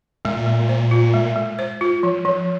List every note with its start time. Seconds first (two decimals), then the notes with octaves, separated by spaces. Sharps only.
0.25 A#2 G#3
0.46 G#3
0.69 C5
0.91 F4
1.14 G#3
1.36 G#3
1.59 C5
1.81 F4
2.03 F3
2.25 F3